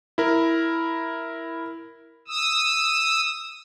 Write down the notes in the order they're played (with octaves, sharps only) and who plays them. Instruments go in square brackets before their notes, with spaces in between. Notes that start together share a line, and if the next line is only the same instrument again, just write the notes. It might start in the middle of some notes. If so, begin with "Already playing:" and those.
[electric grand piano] E4 A#4
[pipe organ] D#6 E6